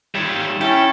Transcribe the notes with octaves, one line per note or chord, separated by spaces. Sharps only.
D#3 G3 C#5 E5
C#4 E4 A4 G5